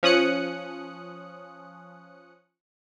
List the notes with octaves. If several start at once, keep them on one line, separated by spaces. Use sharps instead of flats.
F3 C#4 D#6 F#6 C#7